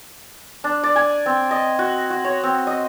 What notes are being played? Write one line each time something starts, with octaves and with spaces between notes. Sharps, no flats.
D4
D5
G#5
C4
D#5
F#4
F#4
C#5
C4
D#5